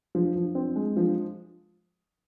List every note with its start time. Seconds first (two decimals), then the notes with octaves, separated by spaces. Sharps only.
0.15 F3
0.36 F3
0.55 C4
0.76 G#3
0.97 F3